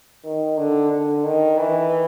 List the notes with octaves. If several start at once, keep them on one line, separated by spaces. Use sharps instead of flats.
D#3
D3
D3
D#3
E3